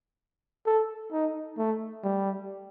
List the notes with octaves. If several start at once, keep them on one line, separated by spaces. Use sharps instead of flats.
A4
D#4
A3
G3